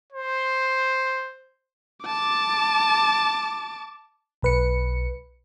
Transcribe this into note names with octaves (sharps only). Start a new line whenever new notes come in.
C5
A5 D6
B1 B4 C#7